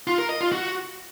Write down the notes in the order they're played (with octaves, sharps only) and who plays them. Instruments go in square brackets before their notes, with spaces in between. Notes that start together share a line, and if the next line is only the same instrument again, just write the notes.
[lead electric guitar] F4
A#4
D#5
F4
F#4